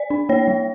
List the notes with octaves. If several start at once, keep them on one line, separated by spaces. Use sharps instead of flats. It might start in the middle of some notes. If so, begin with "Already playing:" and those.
Already playing: D5
D4
A#3 C#5
G3